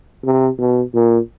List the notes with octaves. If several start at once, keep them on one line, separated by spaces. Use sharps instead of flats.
C3
B2
A#2